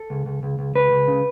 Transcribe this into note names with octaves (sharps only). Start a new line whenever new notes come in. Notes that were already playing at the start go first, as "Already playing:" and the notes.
Already playing: A4
C#2
C#2
C#2
C#2
C#2 B4
C#2
C#3